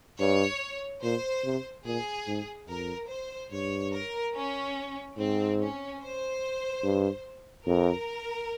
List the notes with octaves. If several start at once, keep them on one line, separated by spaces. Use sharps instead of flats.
G2 C#5
A#2 C5
C3
A#2 G#4
G#2
F2 A#4
C5
G2 C#5
A#4
C#4
G#2 C4
C#4
C5
G2
F2 A#4